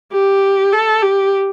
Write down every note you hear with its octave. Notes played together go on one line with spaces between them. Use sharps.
G4
A4
G4